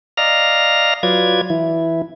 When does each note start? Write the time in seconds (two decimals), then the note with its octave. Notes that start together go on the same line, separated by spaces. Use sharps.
0.17 D5 D#5 F5 A#5 F6 A#6
1.03 F#3 F4 B4 D5 G#6
1.50 E3 E4